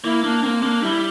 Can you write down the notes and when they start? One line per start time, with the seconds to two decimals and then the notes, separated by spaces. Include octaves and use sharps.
0.04 A#3 E4
0.24 A#3 D4
0.43 A#3 C4
0.62 A#3 D4
0.83 G3 E4